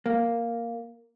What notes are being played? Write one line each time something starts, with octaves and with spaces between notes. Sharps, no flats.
A#3